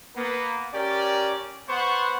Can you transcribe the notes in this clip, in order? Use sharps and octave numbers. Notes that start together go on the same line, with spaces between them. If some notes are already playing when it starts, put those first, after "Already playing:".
A#3 B3
C#4 G4 A#4 D5
B3 C5 F#5 C#6